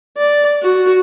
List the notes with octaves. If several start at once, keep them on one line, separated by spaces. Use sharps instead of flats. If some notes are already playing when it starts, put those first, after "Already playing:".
D5
F#4